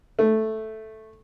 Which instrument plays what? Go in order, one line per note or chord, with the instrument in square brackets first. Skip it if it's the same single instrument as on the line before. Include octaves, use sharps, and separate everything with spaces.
[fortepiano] A3